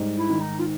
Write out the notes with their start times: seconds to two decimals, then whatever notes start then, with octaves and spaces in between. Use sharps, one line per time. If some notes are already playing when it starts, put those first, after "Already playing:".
Already playing: G#2 G3
0.17 E4
0.29 D#3
0.41 D#4
0.59 F4